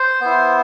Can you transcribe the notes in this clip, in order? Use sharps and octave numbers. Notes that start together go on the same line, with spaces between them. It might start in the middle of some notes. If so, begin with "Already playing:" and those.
Already playing: C5
B3 E4